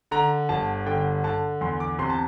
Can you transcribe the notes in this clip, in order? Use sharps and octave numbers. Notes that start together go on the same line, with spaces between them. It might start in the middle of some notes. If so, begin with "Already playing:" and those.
D3 A#5
G1 A5
D3 G5
D3 A5
E2 C6
D6
C3 C6
A5